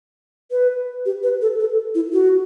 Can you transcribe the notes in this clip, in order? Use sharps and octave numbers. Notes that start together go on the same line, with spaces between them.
B4
G4
B4
A4
A4
E4
F#4